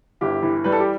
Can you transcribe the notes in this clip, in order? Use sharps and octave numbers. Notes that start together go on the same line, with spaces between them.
G1 E4 G4
E3
G3 B4
A4
G4